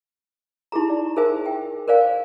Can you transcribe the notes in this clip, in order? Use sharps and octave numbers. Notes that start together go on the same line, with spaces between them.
D#4 E4 G4 G#4 A#5
D5
D#4 G#4 A#4 C5 E5 G#5
E5 G5
A#4 C5 D5 F5 G#5